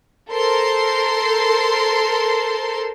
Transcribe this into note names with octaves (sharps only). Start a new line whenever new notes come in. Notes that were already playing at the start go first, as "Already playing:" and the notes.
A4 A#4 C5 C6